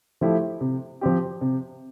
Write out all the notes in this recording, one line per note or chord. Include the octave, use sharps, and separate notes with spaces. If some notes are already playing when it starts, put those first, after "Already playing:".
F3 A3 E4 G4
C3
F3 C4 G4
C3